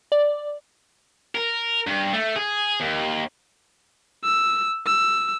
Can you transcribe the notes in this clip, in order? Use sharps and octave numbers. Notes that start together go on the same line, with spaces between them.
D5
A#4
G2
A3
G#4
D#2
E6
E6